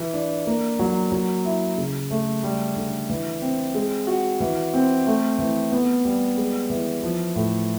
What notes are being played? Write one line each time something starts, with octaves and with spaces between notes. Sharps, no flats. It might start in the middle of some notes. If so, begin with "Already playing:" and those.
Already playing: E3
D4
A#3
F#3
F#3
E4
C#3
A3
G3
D3
E3
C4
G#3
F#4
E3
C4
A3
E3
B3
G3
G#3
E3
F3
A2